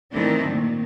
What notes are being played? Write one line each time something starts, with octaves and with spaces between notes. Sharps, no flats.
D#3 E3 A3 C4 D4
A#2 D#3